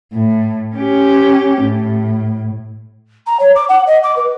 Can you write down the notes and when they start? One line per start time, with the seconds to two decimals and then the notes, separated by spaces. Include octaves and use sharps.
0.13 A2
0.76 C#4 G4
1.62 A2
3.26 A#5
3.39 C#5
3.55 D6
3.68 F#5
3.86 D#5
4.03 D6
4.16 B4